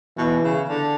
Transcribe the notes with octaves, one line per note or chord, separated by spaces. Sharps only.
B2 E3
C#3
D3